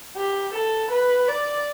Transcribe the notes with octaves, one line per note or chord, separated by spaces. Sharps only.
G4
A4
B4
D5